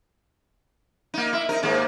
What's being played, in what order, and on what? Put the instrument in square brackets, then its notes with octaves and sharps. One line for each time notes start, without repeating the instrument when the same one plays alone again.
[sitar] A#3 D#4
E4
D#4 A#4
D#2 G#2 A#3